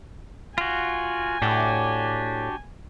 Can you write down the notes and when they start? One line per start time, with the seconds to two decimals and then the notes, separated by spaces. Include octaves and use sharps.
0.58 F4 F#4 G#5
1.42 A2 D4 F#4 G4